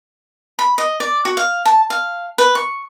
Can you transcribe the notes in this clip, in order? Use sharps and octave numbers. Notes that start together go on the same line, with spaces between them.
B5
D#5
D5
F#4
F5
A5
F5
B4
C#6